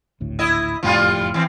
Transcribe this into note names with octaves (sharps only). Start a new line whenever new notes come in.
G#1 D2 A2
E4 D#5
F#1 F2 A2 F3 G3 F4
E3 C4